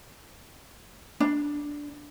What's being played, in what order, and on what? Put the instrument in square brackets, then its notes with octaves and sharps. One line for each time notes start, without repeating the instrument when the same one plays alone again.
[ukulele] D4